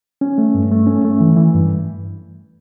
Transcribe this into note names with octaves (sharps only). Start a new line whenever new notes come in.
C#4
A3
G2
A3
C#4
A3
E3
E3
G2